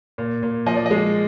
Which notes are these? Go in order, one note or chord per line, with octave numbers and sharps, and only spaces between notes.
A#2
A#2
F3 D#5
D5
D#5
G#3